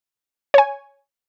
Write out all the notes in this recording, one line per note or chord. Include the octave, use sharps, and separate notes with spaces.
C#5 G#5